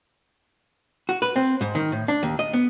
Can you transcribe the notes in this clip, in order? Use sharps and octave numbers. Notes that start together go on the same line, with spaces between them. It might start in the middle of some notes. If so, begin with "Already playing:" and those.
F#4
B4
C4
G#2
D#3
A2
D4
D#2
D#5
B3